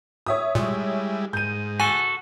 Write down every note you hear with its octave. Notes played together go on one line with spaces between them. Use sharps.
C#5 E5 D#6
A#2 G3 G#3 E4
G#2 G6 D#7
F#4 A4 G#5